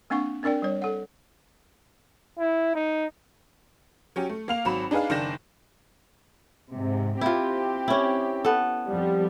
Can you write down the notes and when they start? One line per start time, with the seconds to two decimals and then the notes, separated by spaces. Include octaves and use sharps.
0.10 A#3 C4 D4 F#5 C#6
0.43 C4 D4 A#4 D5 G5
0.62 G3 C#5
0.82 A4 F#5
2.39 E4
2.75 D#4
4.16 F#3 C#4 G4
4.29 A3
4.48 A#3 F5 F7
4.65 G#1 F#3 B5 E7
4.91 D4 D#4 G#4 B4 F5
5.10 F#1 D#3 D4 G6 A#6 E7
6.74 G#2 C3
7.21 C4 E4 F4 G4
7.88 C#4 E4
8.45 B3 A4
8.88 F2 F3 G3